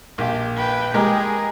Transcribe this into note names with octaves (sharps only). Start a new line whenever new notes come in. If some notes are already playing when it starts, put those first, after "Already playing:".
A#1 G4
B4 G5
G#3 G4 G#4 A#4